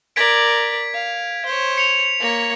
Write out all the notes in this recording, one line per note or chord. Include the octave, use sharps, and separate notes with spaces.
A#4 D5 G#6 B6 D7
F5
C5 C#5
C#7 F7
A#3 C#5